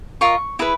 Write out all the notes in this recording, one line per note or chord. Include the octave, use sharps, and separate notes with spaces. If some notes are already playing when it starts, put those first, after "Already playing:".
F4 A#4 D#5 C#6
E4 G#4 B4